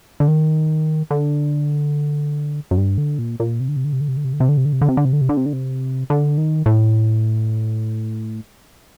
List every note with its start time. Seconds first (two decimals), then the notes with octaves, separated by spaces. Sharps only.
0.20 D3
0.28 D#3
1.11 D3
2.71 F#2
2.78 G2
2.98 D3
3.19 A#2
3.40 A#2
3.60 C3
3.68 D3
3.76 C3
3.84 D3
3.93 C3
4.01 D3
4.08 C3
4.17 D3
4.24 C3
4.33 D3
4.40 C3
4.49 D3
4.57 C3
4.65 D3
4.73 C3
4.81 D3
4.89 C3
4.97 D3
5.05 C3
5.13 D3
5.21 C3
5.29 D3
5.37 C3
5.46 D3
5.53 C3
6.10 D3
6.38 D#3
6.66 A2